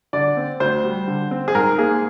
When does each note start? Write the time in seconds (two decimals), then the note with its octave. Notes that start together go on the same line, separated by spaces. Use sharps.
0.13 D3 D5
0.37 C4
0.60 D2 C5
0.84 G3
1.07 D3
1.31 C4
1.48 G#4
1.55 G#2 A#4
1.78 A#3 G#4